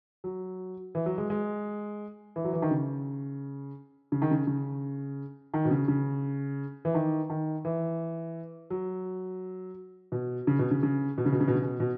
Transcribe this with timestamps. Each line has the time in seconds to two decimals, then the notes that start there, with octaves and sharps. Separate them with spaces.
0.24 F#3
0.95 E3
1.06 F#3
1.18 G#3
1.30 G#3
2.36 E3
2.45 F#3
2.53 E3
2.62 D#3
2.71 C#3
4.12 C#3
4.22 D#3
4.31 C#3
4.47 C#3
5.54 D#3
5.65 B2
5.71 C#3
5.88 C#3
6.85 E3
6.94 D#3
7.30 D#3
7.65 E3
8.70 F#3
10.12 B2
10.47 C#3
10.59 B2
10.71 C#3
10.83 C#3
11.18 B2
11.25 C#3
11.32 B2
11.40 C#3
11.48 B2
11.55 C#3
11.62 B2
11.80 B2